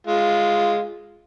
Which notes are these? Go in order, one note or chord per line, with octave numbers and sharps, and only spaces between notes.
G#3 F4